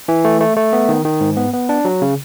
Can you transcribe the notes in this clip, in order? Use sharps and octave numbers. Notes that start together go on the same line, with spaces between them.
E3
A3
A3
A3
B3
D#3
D#3
G#2
B3
B3
D4
F#3
C#3